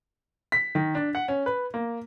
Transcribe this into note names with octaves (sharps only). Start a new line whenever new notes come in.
B6
D#3
D4
F#5
C#4
B4
A#3